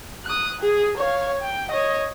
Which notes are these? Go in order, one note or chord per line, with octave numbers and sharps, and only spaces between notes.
D#6 F#6
G#4
C#5 F5
G5
C#5 D#5